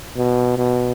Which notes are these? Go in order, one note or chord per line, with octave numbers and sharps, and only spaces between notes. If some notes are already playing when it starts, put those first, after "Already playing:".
B2
B2